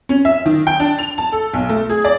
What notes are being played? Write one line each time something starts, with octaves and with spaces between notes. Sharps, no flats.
C#4
E5
D#3
G5
D4
F7
A5
A4
B1
A3
G#4
D5